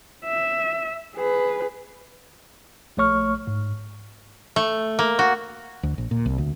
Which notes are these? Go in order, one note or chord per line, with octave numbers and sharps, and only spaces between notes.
E5
G#4 B4
A#1 A3 C#5 C#6 F6
G#2
A3
A#3
F#4
D2
A#1
A#2
C2
D2